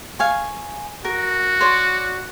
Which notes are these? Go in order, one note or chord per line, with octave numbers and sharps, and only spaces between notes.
F5 G#5 C#6
F#4 A#4
C#5 D5 C6